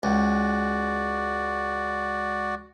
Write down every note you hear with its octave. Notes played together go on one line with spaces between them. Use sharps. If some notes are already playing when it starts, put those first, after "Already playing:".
C#2 F#4 D5